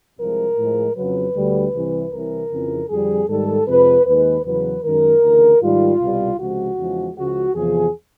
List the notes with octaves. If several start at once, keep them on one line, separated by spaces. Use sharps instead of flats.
C2 C3 F3 G#3 A#4
A2 F3 G#3
F2 C#3 F#3 B4
D2 D3 G3
C2 C3 E3
C2 C3 E3 A#4
F2 C#3 E3
F2 D3 G3 G#4
G#2 D#3 G3 A4
F2 C3 F3 G#3 B4
D#2 D#3 G#3 B4
E2 C#3 F#3 B4
F#2 D#3 G#3 A#4
D2 C#3 E3
G#2 D#3 G3 F4
C2 B2 G3
C#2 C3 F3 G#3 F#4
E2 C#3 F3 G#3
C#2 C#3 F3 G#3 F#4
E2 C3 F3 G#4